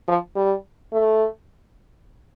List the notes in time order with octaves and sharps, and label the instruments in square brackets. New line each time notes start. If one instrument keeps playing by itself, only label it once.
[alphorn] F3
G3
A3